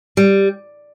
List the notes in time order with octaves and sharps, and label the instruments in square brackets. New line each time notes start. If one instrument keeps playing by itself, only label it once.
[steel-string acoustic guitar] G3